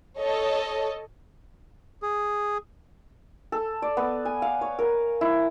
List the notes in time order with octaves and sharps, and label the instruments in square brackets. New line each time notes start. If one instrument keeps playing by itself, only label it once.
[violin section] A4 C#5 D#5
[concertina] G#4
[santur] A4
D5
B3
G#5
F5
C#5
A#4
E4